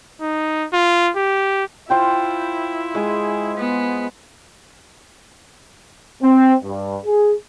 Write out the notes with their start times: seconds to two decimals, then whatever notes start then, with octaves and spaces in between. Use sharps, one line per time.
0.21 D#4
0.73 F4
1.16 G4
1.90 E4 F4 C5 G5
2.95 G#3 G#4
3.57 B3
6.23 C4
6.63 G2
7.05 G#4